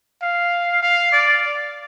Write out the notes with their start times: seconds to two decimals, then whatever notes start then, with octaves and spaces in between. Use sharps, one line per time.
0.22 F5
0.82 F5
1.12 D5